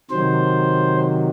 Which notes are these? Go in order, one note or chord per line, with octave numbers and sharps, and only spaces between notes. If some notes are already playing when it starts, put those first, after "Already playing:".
C3 D#3 F#3 C5